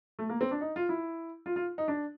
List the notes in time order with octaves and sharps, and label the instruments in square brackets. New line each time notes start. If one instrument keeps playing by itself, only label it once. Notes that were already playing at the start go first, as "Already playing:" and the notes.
[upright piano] A3
A#3
C4
D4
D#4
F4
E4
F4
F4
D#4
D4